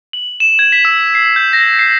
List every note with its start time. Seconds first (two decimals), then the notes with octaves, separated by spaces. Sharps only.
0.13 F#7
0.40 E7
0.59 G#6
0.72 B6
0.85 E6
1.15 C7
1.36 G6
1.53 A#6
1.79 C7